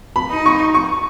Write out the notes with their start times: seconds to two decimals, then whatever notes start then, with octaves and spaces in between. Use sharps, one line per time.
0.16 B5
0.31 D#4
0.46 C#6
0.74 C#6